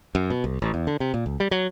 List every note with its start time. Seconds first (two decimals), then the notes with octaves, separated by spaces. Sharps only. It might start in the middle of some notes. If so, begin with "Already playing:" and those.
0.15 F#2
0.30 B2
0.44 C2
0.62 A1
0.74 E2
0.87 D3
1.00 C3
1.14 A#2
1.26 C#2
1.40 G3
1.51 F#3